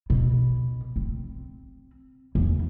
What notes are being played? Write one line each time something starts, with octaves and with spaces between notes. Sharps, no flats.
B2
C4
E2